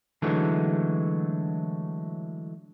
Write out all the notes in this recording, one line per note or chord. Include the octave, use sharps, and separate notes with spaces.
D3 E3 F#3 G#3 A3